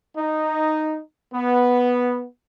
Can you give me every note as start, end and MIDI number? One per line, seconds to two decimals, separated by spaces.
0.17 0.98 63
1.33 2.24 59